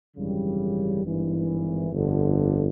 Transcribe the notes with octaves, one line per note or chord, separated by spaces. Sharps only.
G#1 F#2 C#3 E3 G3
G#1 G2 E3
G1 F2 D3